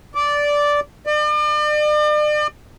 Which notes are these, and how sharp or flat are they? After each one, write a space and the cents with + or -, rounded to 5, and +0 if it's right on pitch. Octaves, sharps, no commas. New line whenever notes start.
D5 -10
D5 +40